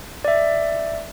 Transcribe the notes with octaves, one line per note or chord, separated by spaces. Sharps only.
D5 E5